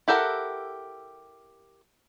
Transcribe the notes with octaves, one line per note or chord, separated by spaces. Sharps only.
E4 G4 A4 A#4 F#5